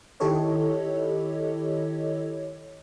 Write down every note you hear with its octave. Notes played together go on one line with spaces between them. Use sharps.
D#3 E4 G4 A4 C#5 D#5